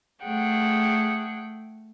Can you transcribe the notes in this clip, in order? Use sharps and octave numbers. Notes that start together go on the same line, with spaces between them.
A3 G#4 F#5 G5